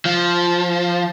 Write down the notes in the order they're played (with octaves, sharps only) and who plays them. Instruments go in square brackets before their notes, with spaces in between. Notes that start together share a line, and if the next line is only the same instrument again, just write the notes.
[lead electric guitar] F3